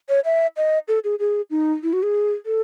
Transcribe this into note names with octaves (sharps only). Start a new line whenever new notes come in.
C#5
E5
D#5
A4
G#4
G#4
D#4
E4
F#4
G#4
A4